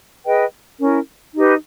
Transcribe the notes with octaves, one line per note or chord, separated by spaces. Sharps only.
G#4 B4 D#5 G5
C#4 E4 A#4
D#4 G4 B4